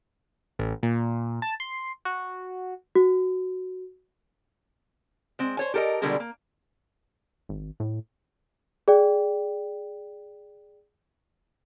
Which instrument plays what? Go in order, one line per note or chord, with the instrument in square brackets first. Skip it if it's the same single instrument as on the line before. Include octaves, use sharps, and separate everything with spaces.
[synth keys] A1
A#2
A5
C6
F#4
[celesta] F#4
[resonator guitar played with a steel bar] G#3 C4
C5 C#5 G#5
G4 A4 A#4 C5 D#5
B2 D3 G3 G#3 G#4 A#4
A#3
[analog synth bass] G#1
A2
[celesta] G#4 D5 G5